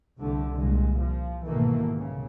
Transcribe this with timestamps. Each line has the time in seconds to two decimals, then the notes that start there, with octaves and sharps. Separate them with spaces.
0.19 C2 D3 A3
0.56 C2 A#2 G#3
1.00 F3
1.46 G#2 B2 D#3 E3 A3 A#3
1.91 C2 C#3